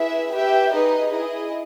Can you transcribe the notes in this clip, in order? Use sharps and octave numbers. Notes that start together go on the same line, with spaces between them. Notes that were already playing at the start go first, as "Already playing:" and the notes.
Already playing: E4 G#4 B4 E5
G4 B4 E5 G5
D#4 G#4 B4 D#5
E4 G#4 D#5